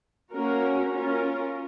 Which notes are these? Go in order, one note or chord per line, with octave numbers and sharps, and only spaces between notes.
A#3 C#4 F#4 A#4
C#4 F4 A#4